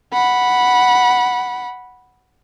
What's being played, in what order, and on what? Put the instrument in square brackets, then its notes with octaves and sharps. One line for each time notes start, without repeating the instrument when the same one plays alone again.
[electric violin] F#5 B5